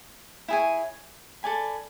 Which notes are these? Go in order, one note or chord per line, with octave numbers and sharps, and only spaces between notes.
E4 G#4 C#5 G#5
A4 D5 G#5 B5